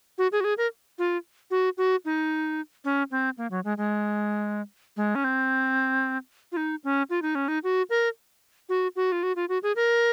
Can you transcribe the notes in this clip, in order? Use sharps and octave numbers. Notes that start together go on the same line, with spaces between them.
F#4
G#4
F#4
G#4
A#4
F4
F#4
F#4
D#4
C#4
C4
A#3
F#3
G#3
G#3
G#3
C#4
C4
F4
D#4
C#4
F4
D#4
C#4
D#4
F#4
A#4
F#4
F#4
F4
F#4
F4
F#4
G#4
A#4